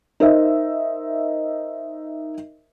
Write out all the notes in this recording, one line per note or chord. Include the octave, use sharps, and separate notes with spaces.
D#4 A#4 C5 E5